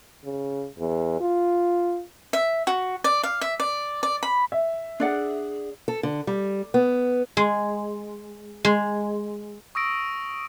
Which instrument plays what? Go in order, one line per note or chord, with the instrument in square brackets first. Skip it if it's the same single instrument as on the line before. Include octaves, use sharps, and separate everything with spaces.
[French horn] C#3
E2
F4
[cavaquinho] E5
F#4
D5
F5
E5
D5
D5
B5
[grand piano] E5
[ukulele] D4 D5 F#5 [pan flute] G#4
[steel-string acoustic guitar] A4
D3
G3
B3
[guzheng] G#3
G#3
[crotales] C#6 D#6 E6 A#6 D7